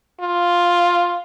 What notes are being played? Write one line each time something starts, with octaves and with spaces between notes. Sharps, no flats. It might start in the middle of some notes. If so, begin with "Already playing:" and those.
F4